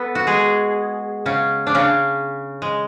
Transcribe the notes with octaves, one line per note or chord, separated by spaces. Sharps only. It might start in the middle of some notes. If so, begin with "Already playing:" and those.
Already playing: B3 A4 B4
F#4
G#3 G#4
C#3 C#4
D4
C#3 C#4
G#3